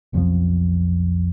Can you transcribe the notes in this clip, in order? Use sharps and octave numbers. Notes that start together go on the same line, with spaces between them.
B1 F2 F3